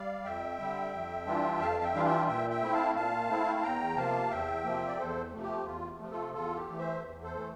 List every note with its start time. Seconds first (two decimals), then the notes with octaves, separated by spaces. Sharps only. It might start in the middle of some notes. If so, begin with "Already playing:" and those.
Already playing: G3 D5 F5
0.24 F2 E5 G5
0.59 D3 G3
0.93 F2
1.27 E3 G3 D4 F4
1.60 F2 F5 A5
1.83 E5 G5
1.94 E3 G3 D4 F4 F5
2.06 E5 G5
2.27 A#2 E5 G5
2.50 E5 G5
2.62 A3 C4 E4
2.73 F5 A5
2.96 A#2 F5 A5
3.29 A3 C4 E4
3.56 A5
3.63 E2 G5 A#5
3.97 C3 F3 A#3 F5 A5
4.31 E2 E5 G5
4.65 C3 F3 A#3
4.88 D5
4.98 E2 A4 C5
5.33 C3 F3 A3
5.43 G4
5.66 E2 F4
5.99 C3 F3 A3
6.11 F4 A4
6.34 E2 F4 A4
6.56 G4
6.68 E3 A3
6.78 C5 E5
7.02 E2
7.23 A4 C5
7.35 E3 A3